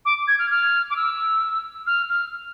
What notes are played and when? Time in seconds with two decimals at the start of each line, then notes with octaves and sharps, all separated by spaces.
0.05 D6
0.28 G#6
0.39 F6
0.51 F6
0.90 D6
0.96 E6
1.87 F6
2.09 F6